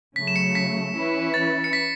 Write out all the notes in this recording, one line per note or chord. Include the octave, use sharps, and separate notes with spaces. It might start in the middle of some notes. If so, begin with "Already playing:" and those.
C#3 F#3 A3 B6
E7
C#7
B6
E3 C#4 E4 B4
A6
C#7
B6